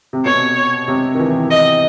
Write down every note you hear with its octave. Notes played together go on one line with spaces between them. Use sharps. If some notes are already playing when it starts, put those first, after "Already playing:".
C3
B2 C#5
C3
D#3
E3
D#5